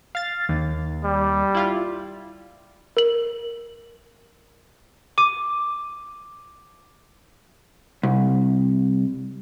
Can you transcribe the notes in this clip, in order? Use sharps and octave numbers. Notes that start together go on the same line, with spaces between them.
F5 A6
D#2
G3
E4 F4
A#4 F#7
D6 D#7
C2